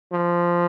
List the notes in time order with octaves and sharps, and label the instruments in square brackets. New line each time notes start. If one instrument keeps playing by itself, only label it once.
[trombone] F3